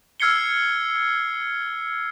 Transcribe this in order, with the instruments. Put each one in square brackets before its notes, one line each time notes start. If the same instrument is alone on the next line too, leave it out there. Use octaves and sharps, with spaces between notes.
[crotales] E6 F6 G#6 C7 C#7 G7